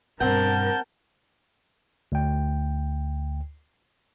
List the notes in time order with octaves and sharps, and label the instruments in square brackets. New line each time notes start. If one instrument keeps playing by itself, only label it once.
[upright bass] G2 B2 [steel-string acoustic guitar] C4 F#5 [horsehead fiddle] A#4 A5 [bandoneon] G6
[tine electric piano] D2 G5